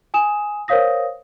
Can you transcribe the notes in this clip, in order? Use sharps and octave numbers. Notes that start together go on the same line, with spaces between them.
G#5 D#6 E7
A#4 C5 C#5 F5 D#6 A#6